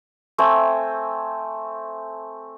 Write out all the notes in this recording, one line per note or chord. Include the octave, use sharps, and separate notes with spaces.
A3 C4 G5 G#5